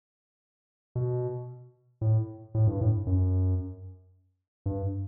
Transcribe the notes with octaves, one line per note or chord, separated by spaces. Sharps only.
B2
A2
A2
G2
A2
F#2
G2